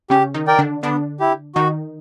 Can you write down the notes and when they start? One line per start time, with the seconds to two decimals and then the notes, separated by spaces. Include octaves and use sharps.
0.10 C#3 C#4 G4
0.34 D#3 D#4
0.47 A#4 D5 G5
0.59 D3 D4
0.83 D3 B3 D4
1.20 E4 G4
1.55 D#3 D#4 F#4